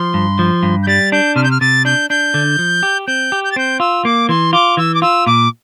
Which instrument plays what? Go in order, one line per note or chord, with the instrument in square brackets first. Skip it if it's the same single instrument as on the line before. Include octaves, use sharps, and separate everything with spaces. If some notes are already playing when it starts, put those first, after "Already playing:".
Already playing: [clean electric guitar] F3 [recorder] C6
[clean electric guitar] G2
F3
G2
[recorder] G6
[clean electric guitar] G3 [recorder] A6
[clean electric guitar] D4 [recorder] G6
[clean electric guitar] C3 [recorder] F6
[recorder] G6
F6
[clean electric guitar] C3 [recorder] A6
[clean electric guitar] D4 [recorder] G6
[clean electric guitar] D4 [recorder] G6
[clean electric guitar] D3
F3
G4
[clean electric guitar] C4 [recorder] G6
[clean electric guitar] G4
[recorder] G6
A6
[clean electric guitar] C4 [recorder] G6
[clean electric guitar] F4 [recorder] E6
[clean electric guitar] A#3 [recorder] D6
[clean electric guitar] E3 [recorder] C6
[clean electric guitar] F4 [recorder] D6
[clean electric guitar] E3 [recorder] E6
[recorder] D6
[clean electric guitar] F4 [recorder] E6
[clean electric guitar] A#2 [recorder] D6